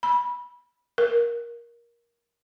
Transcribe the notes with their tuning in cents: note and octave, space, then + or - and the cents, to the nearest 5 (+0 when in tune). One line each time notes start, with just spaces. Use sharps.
B5 -20
A#4 +15